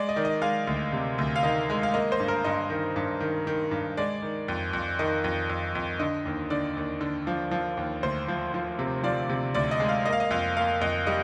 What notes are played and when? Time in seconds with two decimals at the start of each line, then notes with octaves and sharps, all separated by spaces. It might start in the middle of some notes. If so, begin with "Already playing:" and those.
Already playing: G#3 D5
0.09 D#5
0.16 D#3 D5
0.25 D#5
0.42 G#3 F5
0.67 D2
0.93 C3
1.18 D2
1.36 F5
1.43 D#3 D#5
1.70 G#3
1.83 F5
1.94 A#3 D#5
2.12 C5
2.20 G2
2.28 A#4
2.44 G2 D#5
2.70 D#3
2.96 G2
3.21 D#3
3.47 D#3
3.71 G2
3.97 G#3 D5
4.22 D#3
4.48 F2
4.73 F2
4.99 D#3 D#5
5.24 F2
5.49 F2
5.75 F2
5.99 D3 D#5
6.25 D#2
6.50 D3 D5
6.77 D#2
7.01 D3
7.27 F3
7.51 F3
7.77 D#2
8.03 D2 C5
8.28 F3
8.54 F3
8.79 C3
9.03 F3 D5
9.29 C3
9.55 D2 D5
9.71 D#5
9.80 G#3
9.89 F5
10.05 A#3 D#5
10.13 F5
10.20 D#5
10.31 F2 F5
10.57 A#3 F5
10.81 F2 D#5
11.07 G3 D#5